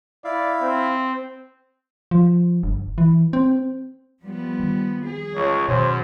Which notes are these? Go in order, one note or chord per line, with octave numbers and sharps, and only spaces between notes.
E4 D5 E5 F5
C4
F3
G1
E3
C4
F3 G3 B3
D#3
G#4
C#2 C#5
F#2 B2 D#3 C5